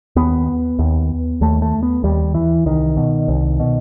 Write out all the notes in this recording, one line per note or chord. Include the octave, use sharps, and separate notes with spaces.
D#2 B3
D#2
D#2 A3
A3
B3
D#2 G3
E3
C2 D#3
B2
C2
B2